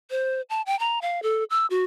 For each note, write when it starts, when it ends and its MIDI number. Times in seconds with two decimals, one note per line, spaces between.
0.10 0.42 72
0.50 0.62 81
0.66 0.78 79
0.79 0.99 82
1.02 1.20 77
1.23 1.44 69
1.50 1.66 88
1.70 1.85 66